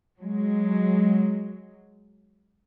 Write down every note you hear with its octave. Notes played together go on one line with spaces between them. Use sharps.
F#3 G#3